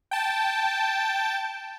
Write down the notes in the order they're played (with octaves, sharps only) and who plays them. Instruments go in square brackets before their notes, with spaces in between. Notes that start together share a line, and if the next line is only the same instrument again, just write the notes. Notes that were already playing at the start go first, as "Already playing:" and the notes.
[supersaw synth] G5 A5